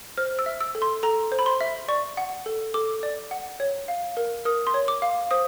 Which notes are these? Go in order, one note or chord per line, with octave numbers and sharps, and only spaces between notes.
C5 F6
E6
E5
E6
A4
C6
A4 A#5
C5
B5
C6
E5
D5 C#6
F#5
A4
A4 D6
D5
F#5
C#5
F5
A#4
A#4 D#6
C6
C#5
D6
F5
C5 D#6